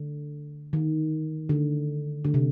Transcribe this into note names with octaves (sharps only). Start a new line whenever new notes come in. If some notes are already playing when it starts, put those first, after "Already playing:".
Already playing: D3
D#3
D3
D3
C3